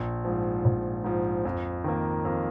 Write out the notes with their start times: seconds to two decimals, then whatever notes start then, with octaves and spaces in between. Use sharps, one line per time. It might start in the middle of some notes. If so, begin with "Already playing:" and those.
Already playing: A#1
0.25 G#2 F3
0.65 A#1
1.04 G#2 F3
1.45 F2
1.84 D#3 A#3
2.25 F2